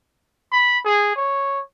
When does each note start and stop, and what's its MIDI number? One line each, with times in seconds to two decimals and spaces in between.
0.52 0.78 83
0.85 1.11 68
1.16 1.59 73